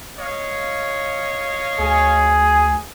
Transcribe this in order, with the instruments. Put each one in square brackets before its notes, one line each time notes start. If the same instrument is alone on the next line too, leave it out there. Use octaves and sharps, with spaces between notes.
[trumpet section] C#5 D#5 F5
[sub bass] D2 [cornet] G#4